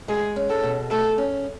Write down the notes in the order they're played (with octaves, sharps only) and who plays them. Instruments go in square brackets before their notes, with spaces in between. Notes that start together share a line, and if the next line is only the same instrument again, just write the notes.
[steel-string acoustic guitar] G#3 [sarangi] G#4
[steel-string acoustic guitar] C#4
[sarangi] A4
[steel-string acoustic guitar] B2
[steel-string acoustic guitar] A3 [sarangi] A4
[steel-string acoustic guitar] C#4